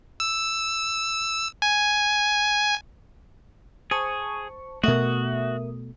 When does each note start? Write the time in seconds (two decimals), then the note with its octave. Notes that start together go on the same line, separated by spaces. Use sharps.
0.20 E6
1.62 G#5
3.91 G#4 C5 A5 C#6
4.84 B2 A3 F#4 A#4 E5 D#6